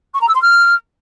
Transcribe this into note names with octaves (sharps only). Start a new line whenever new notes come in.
C#6
A#5
E6
C6
F6